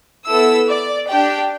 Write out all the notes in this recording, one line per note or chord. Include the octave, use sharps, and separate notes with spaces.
B3 E4 A4 E6
D5
D4 G4 G5